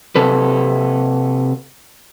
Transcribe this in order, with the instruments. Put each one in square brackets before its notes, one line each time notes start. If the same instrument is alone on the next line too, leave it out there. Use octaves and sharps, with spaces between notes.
[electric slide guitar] C3 A4 B4